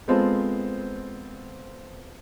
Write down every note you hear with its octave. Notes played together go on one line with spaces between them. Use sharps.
G#3 B3 C4 F4 A4 C5